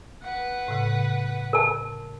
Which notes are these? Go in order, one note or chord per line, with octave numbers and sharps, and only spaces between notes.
B4 F#5
A2 C#3
A#4 A5